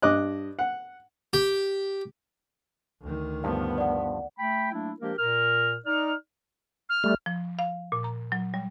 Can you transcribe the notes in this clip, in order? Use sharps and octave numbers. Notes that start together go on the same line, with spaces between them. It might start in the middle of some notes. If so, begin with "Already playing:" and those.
G2 D#5 D6 F#6
F#5
G4
D2 D#3
G2 F3 B3
D5 F#5
A3 G5 B5
F#3 A3 A#3 D4 E4
F3 G#3 A#3 D4 G4 A#4
A#2 A#4 F6
D#4 D5 F6
F6
G3 A3
F3
F5
A#2
A#5
F#3
G3